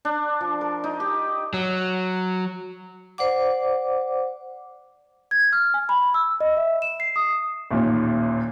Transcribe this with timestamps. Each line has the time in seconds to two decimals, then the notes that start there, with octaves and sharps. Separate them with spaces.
0.05 D4
0.41 F3
0.61 A#4
0.84 D#4
1.00 G4
1.54 F#3
3.18 C5 D5 F#5 D6
5.31 G#6
5.53 F6
5.74 G#5
5.89 B5
6.14 E6
6.41 D#5
6.57 E5
6.82 E7
7.00 C7
7.16 D#6
7.71 A1 D#2 A#2